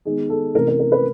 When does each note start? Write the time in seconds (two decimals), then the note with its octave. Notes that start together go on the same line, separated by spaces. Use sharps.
0.05 D#3 G#3 B3 D#4 G#4
0.30 A4
0.54 C3 E3 A3 C#4 A#4
0.67 A#4
0.79 A#4
0.92 B4